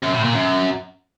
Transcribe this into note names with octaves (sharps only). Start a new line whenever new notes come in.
F#2
A2
A#2
F#2